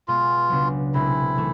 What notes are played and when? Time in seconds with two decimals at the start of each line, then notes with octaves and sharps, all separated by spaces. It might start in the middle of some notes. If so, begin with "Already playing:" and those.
0.08 B2 G#3 B3 F4
0.49 C#2 C#3 F#3 B3 D4
0.94 C2 B2 G#3 C4 D#4 E4
1.38 E3 A3